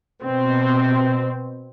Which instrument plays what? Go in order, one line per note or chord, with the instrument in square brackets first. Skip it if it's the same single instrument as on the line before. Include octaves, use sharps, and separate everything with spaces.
[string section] B2 C4